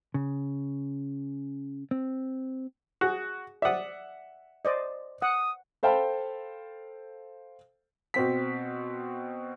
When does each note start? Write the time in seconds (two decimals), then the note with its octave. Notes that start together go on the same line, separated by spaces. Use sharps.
0.14 C#3
1.91 C4
3.01 F#4 G#4
3.62 D5 E5 F#5 D#6
4.65 C5 D5 D#5
5.22 F#5 D#6
5.83 A4 C5 F5 G5 A5 B5
8.14 B2 C4 B6